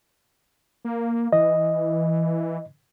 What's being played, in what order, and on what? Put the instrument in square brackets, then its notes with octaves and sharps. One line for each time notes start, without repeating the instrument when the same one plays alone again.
[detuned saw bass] A#3
[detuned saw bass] E3 [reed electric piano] D#5